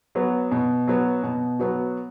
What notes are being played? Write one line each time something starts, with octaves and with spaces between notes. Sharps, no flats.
F#3 B3 F#4
B2
F#3 B3 F#4
B2
F#3 B3 F#4